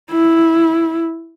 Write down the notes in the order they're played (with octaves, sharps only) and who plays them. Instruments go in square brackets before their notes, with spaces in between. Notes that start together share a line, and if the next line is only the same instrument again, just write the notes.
[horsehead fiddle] E4